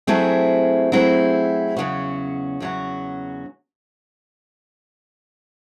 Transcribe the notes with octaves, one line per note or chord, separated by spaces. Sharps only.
F#3 A3 C4 E4 G#4
F#3 A3 C4 E4 G#4
E2 C#3 F#3 C#4 F#4
E2 C#3 F#3 C#4 F#4